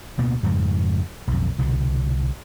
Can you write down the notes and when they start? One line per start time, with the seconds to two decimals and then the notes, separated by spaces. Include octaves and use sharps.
0.18 D2 B2 A#3
0.43 F2 G#2 C#3
1.27 B1 F2
1.58 C2 B2 D3